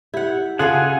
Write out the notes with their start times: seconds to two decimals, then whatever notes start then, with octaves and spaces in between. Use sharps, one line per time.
0.14 E4 G4 F#5
0.59 C#3 F4 G#4 A4 F5 F#5 G#5